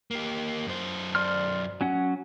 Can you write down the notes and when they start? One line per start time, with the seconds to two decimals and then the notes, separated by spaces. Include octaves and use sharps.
0.11 A#3 G4
0.67 F#2 C5
1.15 D5 C6 F6
1.81 F#3 C#4 F#5